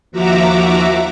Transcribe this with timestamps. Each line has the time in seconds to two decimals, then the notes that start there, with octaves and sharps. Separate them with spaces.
0.11 D#2 F3 F#4 E5 A#5 D6